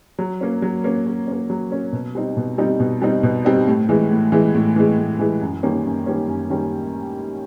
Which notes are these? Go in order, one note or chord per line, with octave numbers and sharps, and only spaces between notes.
F#3
A#3 C#4
F#3
A#3 C#4
F#3
A#3 C#4
F#3
A#3 C#4
B2
G3 C4 D#4
B2
G3 C4 D#4
B2
G3 C4 D#4
B2
G3 C4 D#4
A2
E3 G#3
A2
E3 G#3
A2
E3 G#3
A2
E3 G#3
F#2
D#3 G3 A#3 C#4
F#2
D#3 G3 A#3 C#4
F#2
D#3 G3 A#3 C#4